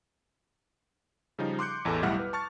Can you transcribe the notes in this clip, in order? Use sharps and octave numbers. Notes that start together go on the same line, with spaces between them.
C#3 F3 G3 D#4
C6 D6 F#6 G6 C#7
A1 E2 A3 A4 A5
B1 A2 G3 E4 F#5 F6
B4
A5 C#6 F6 A6